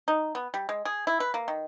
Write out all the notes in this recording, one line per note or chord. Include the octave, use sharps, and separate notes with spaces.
D#4
B3
G3
G#3
G#4
E4
B4
A#3
D#3